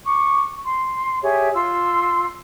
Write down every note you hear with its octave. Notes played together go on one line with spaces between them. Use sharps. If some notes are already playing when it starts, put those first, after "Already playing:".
C#6 D6
C6
G4 G#4 C#5 E5
F4 C6 E6